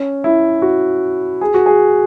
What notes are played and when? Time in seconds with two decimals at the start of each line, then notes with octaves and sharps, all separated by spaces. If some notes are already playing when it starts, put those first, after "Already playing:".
Already playing: C#4
0.24 E4
0.62 F#4
1.41 G#4
1.54 F#4
1.66 G#4